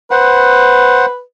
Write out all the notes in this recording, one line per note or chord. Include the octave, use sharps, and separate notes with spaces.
B4 C5 F#5